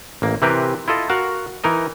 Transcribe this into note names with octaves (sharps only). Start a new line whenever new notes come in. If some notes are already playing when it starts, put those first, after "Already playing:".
A1 A#3
C3 E3 C4 G4 A#4 B4
E4 F4 A4 D#5
F#4 A#4 F5 F#5
E3 D#4 A#4 D#5